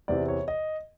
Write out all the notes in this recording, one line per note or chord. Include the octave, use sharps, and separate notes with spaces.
E2 C3 E3 D5
C#5
D#5